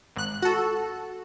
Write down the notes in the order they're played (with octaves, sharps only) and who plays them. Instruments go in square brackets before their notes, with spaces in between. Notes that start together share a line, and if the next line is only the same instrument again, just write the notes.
[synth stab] G#1 F#6
F#4 A4